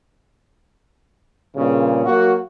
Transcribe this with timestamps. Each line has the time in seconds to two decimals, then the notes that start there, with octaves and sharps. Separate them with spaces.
1.55 G2 A#2 C#3
2.06 F#3 A#3 F#4